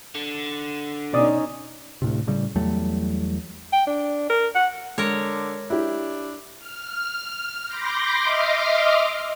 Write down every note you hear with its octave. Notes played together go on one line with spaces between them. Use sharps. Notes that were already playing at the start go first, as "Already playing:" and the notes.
D3
B2 C#4 D#4 D5 D#6
D2 A2 C3
A2 C#3 G3
E2 F#3 G3 A3
G5
D4
A#4
F#5
D3 G#3 A#4 C#5
D4 E4 G4
F6
B5 C6 D6 G6 A#6
D#5 E5 C6 D6 D#6 F6